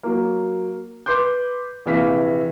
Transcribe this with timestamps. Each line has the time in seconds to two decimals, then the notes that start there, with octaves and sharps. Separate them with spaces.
0.03 F#3 A#3
1.06 B4 C6 D6 G6
1.86 A#1 C3 E3 F5 B6